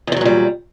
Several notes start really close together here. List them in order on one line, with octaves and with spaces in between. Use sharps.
E2 D#3 F#3 A#2 G3